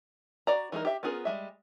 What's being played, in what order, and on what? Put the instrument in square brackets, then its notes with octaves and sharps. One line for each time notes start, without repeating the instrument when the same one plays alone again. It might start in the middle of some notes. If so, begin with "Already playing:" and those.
[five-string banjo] F#4 D5 A#5
E3 G#3 D#4 A#4
G4 E5
B3 C#4 F4 G#4 A#4
G3 G#3 E5